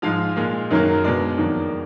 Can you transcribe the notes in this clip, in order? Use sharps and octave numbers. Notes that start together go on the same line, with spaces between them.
G#2 F3 G#3 F4 F5
A#2 G#3
F#2 D#3 F#3 A#3
B2 G#3 D4 D5
F2 D#3 F#3 A#3